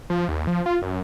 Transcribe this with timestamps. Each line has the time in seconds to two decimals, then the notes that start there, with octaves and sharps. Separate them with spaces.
0.10 F3
0.28 D#2
0.47 F3
0.66 F4
0.82 F#2